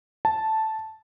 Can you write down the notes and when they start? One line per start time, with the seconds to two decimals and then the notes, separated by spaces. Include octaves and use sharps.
0.25 A5